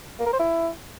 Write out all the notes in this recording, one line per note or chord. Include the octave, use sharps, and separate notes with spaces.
A#3
A#4
C5
E4